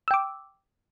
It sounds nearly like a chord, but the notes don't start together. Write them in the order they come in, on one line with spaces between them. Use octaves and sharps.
E6 G5 D6